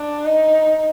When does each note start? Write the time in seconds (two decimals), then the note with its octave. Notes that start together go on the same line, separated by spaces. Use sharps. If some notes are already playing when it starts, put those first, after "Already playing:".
Already playing: D4
0.25 D#4